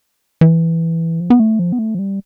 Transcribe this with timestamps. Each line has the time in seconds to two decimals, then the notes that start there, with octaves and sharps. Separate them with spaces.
0.41 E3
1.20 F3
1.30 B3
1.40 A3
1.59 F3
1.72 B3
1.79 A3
1.95 F3
1.99 G3